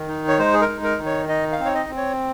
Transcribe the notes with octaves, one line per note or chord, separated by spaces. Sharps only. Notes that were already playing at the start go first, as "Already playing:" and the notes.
Already playing: D#3
D#4
C#5
G#3 C5
G#4
A#4
D#4
A#4
D#3
C#5
D#4 D#5
F5
C4
C#5
D#5
C4
C#5